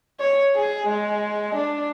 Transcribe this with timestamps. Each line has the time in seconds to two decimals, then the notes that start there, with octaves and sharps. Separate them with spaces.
0.20 C#5
0.55 G#4
0.88 G#3
1.55 D4